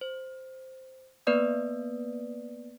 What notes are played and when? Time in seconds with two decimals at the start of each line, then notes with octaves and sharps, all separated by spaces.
0.01 C5
1.27 A#3 B3 B4 D5 D#6